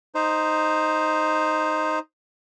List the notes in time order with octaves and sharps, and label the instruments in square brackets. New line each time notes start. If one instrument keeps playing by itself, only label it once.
[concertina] D#4 C5